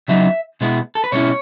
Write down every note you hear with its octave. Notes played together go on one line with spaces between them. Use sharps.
C#3 F#3 B3 D#4 E5
B2 G#3 B3 E4
A4
B4
B2 G#3 C#4 E4 C#5